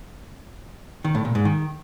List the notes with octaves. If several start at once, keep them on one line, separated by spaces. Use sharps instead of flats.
D#3
A2
A#2
G#2
D#3